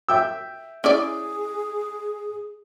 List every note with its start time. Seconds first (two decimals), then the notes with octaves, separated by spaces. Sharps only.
0.09 E5 G5 E6
0.84 C#4 E4 G#4 D5